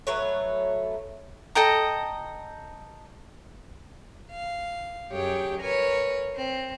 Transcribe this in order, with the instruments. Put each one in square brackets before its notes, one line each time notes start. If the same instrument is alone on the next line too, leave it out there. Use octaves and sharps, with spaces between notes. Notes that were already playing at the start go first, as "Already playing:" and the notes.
[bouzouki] F#3 A3 B4 C#5
[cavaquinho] A4 D#5 G5 A#5
[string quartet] F5
F#2 G4 G#4 C#5 G5
A#4 B4 C#5 G#5
C4